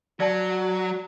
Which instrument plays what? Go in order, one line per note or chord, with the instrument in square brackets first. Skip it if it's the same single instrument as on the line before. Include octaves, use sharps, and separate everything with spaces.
[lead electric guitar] F#3 [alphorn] F#4 [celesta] D5 A5